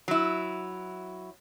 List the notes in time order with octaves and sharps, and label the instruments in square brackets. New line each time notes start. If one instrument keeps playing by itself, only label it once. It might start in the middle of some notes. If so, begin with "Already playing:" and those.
[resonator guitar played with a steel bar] F#3 E4